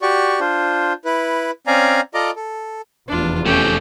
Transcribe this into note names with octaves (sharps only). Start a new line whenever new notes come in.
F#4 G4 D5 C#6
D4 F4 C5
E4 B4
C4 C#4 D5 F5 G#5 A#5
F4 A4 D5 D#5 A#5 D6
A4
F1 E2 D4 F4
A3 C4 C#4 G4